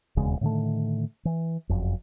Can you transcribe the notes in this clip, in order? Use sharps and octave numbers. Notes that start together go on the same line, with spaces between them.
E1 D#2 C#3 G#3
A2 D3 D#3 A3
E3
F#1 F2